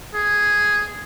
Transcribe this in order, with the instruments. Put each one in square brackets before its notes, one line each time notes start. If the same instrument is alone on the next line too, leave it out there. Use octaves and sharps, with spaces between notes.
[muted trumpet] G#4